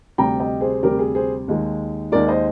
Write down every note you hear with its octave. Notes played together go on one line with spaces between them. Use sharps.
D2 C3 G3 G5 A#5
D#5 G5
G#4 C5
D2 C3 G3 G4 A#4
G#4
G#4 C5
D#2 D#3 G#3
D#2 D#3 G#3 A#4 D5
C5 D#5